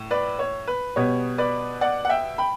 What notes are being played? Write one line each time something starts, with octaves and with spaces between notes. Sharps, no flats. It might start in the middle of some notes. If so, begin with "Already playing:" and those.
Already playing: A2
B4 D5
C#5
B4
B2 G3 B3 C#5
B4 D5
D5 F#5
F#5
E5 G5
G5 B5